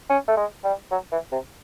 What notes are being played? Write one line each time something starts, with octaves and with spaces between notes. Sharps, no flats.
C#4
A3
G#3
G3
F#3
E3
C3